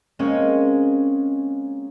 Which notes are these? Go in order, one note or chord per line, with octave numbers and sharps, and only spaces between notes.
G#3 A#3 C4 C#4 G#5